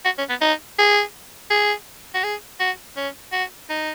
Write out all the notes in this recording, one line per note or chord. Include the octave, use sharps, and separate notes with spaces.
F#4
C#4
B3
D#4
G#4
G#4
F#4
G#4
F#4
C#4
F#4
D#4